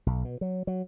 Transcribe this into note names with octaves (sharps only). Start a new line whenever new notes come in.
B1
B2
F#3
F#3